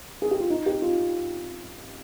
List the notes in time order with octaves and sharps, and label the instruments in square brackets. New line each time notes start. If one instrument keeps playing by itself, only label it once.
[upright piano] G#4
G4
F4
D#4
G4
F4